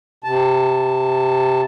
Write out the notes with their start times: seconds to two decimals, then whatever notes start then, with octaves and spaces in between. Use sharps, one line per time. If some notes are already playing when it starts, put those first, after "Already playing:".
0.24 C3 A5